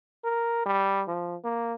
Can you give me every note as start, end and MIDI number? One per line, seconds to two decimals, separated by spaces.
0.24 0.62 70
0.66 1.02 55
1.08 1.36 53
1.44 1.74 58